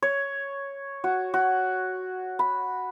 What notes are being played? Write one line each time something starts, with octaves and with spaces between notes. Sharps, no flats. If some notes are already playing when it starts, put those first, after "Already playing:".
C#5
F#4
F#4
B5